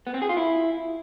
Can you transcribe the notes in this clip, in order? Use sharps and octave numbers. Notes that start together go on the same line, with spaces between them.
B3
C4
G#4
F4
E4